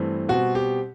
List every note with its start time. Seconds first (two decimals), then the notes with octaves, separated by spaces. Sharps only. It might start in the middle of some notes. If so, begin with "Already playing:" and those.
Already playing: G2 E3 A3 C4
0.29 B2 G3 C4 F#4
0.55 G4